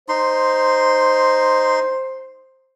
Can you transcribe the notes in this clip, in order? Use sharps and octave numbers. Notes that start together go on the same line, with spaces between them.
D#4 C5 C6